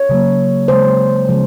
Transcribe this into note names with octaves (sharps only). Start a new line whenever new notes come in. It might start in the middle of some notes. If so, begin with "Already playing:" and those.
Already playing: C#5
C#3 F#3 A#3
C#3 G#3 C5
C#3 F3 G#3